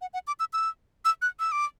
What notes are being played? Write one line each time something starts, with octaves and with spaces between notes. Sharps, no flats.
F#5
F#5
D6
E6
E6
E6
F#6
E6
D6